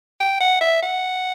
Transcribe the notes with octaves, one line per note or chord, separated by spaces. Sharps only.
G5
F#5
E5
F#5